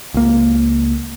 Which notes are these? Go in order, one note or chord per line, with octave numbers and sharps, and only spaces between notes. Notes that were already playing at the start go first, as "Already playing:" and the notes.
C#2 A#3